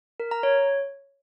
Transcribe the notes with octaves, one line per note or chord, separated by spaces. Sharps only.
A#4
A#5
C#5